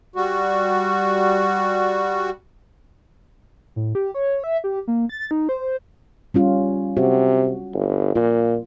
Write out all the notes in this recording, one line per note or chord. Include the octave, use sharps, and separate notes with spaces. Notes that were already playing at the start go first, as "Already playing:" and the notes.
G3 F#4
A2
G4
C#5
E5
G4
A#3
A6
D#4
C5
G3 C#4 F4
C3 F#4
G1
A#2 F4